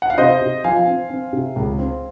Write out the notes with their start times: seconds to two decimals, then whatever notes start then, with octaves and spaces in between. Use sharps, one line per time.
0.02 F#5
0.10 F5
0.18 C3 C5 D#5
0.41 C3
0.64 F3 F5 G#5
0.87 C4
1.10 C4
1.33 C3
1.56 C#2
1.79 C4